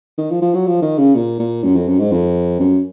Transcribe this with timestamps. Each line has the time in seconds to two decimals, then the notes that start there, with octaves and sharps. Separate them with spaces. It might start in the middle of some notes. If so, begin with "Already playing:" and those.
0.18 D#3
0.31 F3
0.42 F3
0.54 F#3
0.67 F3
0.82 D#3
0.98 C#3
1.15 A#2
1.39 A#2
1.63 F#2
1.76 F2
1.88 F#2
1.99 G#2
2.11 F2
2.60 F#2